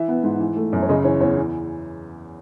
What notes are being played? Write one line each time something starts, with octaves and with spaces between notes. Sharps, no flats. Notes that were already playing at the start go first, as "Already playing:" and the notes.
Already playing: E3 E5
B3
G#2
E3
A3
F#2
C#5
C#3 D#5
E3 C#5
E2 C#5
E3